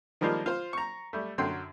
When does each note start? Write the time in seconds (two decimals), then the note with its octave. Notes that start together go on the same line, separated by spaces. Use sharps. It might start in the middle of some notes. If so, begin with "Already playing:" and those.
0.21 D#3 F3 G3 G#3 A#3 F4
0.46 F4 C5
0.73 A#5 C#6
1.13 G3 A3
1.38 F#2 D3 F#3 G5 C6